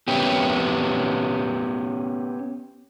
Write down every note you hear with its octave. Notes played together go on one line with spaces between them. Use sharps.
B3 C#4 G4